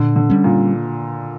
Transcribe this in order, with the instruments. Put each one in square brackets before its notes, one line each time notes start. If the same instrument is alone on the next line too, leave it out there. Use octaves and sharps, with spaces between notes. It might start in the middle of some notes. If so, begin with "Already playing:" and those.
Already playing: [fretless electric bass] A#2 [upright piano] D3
[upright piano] D3
[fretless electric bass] G3 C#4
[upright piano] A#2